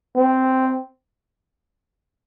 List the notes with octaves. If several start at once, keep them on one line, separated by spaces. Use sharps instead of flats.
C4